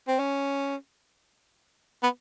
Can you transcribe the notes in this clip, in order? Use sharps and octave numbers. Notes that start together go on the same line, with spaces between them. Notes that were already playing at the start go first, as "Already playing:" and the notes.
C4
C#4
B3